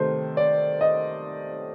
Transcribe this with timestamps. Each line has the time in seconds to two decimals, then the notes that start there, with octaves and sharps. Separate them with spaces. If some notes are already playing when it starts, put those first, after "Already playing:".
Already playing: C3 D#3 A3 C5
0.37 D5
0.81 D#5